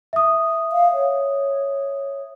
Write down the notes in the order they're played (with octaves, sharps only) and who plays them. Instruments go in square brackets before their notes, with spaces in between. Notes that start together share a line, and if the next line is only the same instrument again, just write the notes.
[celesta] E5 D#6
[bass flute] F5
C#5